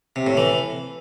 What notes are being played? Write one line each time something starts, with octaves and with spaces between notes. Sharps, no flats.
C3
A2
E3